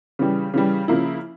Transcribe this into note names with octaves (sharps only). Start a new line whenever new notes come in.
C#3 E3 G3
C#3 E3 G3
C#3 F3 A#3 E4